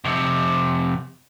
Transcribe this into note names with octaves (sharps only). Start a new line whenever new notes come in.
F2 C3